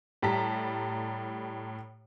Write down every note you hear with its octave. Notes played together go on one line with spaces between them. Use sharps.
A2 G3 A5 A#5 B6